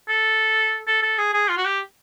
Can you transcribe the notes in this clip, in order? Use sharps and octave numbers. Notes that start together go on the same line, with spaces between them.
A4
A4
A4
G#4
G#4
F4
F#4
G4